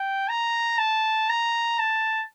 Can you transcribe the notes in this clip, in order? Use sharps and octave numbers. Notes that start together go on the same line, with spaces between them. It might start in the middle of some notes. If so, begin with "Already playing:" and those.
Already playing: G5
A#5
A5
A#5
A5